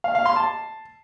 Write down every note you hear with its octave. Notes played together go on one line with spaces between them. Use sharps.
F5
F5
C6
A5